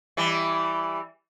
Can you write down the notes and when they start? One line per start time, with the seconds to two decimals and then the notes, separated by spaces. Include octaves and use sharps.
0.17 E3 G3